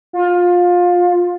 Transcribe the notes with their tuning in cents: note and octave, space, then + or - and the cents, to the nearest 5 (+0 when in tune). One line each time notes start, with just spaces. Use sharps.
F4 +20